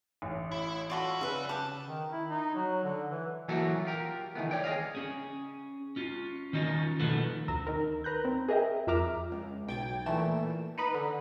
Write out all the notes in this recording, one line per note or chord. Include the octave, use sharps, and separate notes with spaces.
A1
E4
F4 F#4 A4 D5 B5
C#3 B4 E5
G4 F#5 A5
D#3
E4
D#4
F#3
D3
E3
E3 F#3 A#3 F#4 A4 E5
F4 G4 A#4
D#3 E3 A3 B3
C#5 D5 G5
G#4 A#4 D#5 F5
C#4 G#4
C#4 F4
D#3 C#4 D#4 F4
B2 D#3 F3 A3 B3
D2 A#5 E6
D#3 A#4
B4 A#5 F#6 G6
C4
G#4 A#4 D#5 E5 G5
F2 F4 E5 A#5 D6 F6
C#2
B1 G5 G#6 A6 D7
A#2 E3 A3 E7
D#4 B4 B5
D3